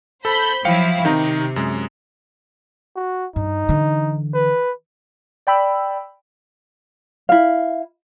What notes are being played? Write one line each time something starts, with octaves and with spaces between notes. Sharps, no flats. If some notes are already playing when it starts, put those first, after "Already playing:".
A4 C5 A5 B5 G6
F3 F#3 E4 F5 G5 C#7
C3 D#3 D#4 A#5
F#2 G#3
F#4
G2 D#4
D3 E3
B4
D5 G5 B5 E6
E4 F5